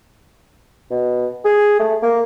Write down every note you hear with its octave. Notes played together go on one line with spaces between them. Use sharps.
B2
G#4
A3
A#3